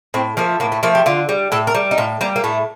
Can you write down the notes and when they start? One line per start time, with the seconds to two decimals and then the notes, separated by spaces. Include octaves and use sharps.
0.14 A2 C4
0.37 F3 A3 A#3
0.60 A2 A#3
0.72 A3
0.83 F3 A3 A#3
0.95 G4
1.06 D3 F4
1.29 G3
1.52 A2 A4
1.67 A#4
1.75 G3
1.91 D#4
1.98 A2 F4
2.21 G3 A#3
2.36 A#3
2.44 A2 A3